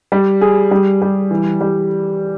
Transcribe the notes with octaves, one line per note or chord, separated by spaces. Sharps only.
G3
G#4
G3
G3
E3
G3